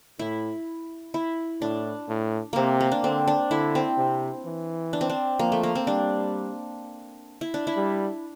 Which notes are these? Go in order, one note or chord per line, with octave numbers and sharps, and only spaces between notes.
A2 E4
E4
A2 D4
A2
C3 A#3 C4
A#3
D4
D3 C4
D4
D3 E4
C4
C3
E3
D4
C4
D4
F3 A#3
A3
A#3
C4
G3 D4
E4
D4
E4
G3